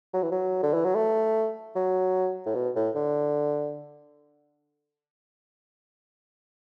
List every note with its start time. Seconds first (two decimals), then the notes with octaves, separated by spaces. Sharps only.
0.14 F#3
0.22 E3
0.32 F#3
0.63 D3
0.74 E3
0.85 F#3
0.95 A3
1.75 F#3
2.46 A2
2.55 B2
2.76 A2
2.95 D3